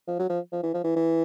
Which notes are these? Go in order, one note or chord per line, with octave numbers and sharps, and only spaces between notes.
F3
F#3
F3
F3
E3
F3
E3
E3